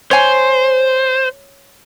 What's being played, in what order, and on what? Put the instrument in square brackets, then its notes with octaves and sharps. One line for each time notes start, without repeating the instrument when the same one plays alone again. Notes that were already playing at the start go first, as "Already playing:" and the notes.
[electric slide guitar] C5 [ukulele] C#5 G#5